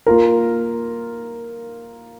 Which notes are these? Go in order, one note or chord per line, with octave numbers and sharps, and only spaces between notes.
A#3 F4 A#4